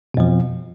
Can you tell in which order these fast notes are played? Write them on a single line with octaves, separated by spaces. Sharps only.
B2 F2 F3